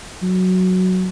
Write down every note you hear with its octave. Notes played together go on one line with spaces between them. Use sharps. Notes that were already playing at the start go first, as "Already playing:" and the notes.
F#3